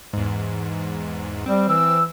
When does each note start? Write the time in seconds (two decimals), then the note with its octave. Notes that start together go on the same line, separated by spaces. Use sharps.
0.13 E2 G#2
1.46 G3 C4
1.69 E3 E6